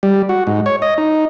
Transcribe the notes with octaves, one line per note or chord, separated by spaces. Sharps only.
G3
F#4
G#2
C#5
D#5
D#4